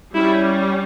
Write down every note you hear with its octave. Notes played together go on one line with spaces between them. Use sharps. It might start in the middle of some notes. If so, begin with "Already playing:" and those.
G3 C#4 E4